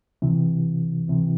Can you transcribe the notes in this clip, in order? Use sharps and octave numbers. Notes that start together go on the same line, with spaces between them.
C2 C3 E3
C2 C3 E3